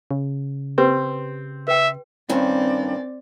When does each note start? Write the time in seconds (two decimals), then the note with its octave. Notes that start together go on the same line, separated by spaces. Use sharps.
0.11 C#3
0.78 C4 G4 B4
1.68 B4 E5 G5
2.29 G2 D#3 C4 C#4 D5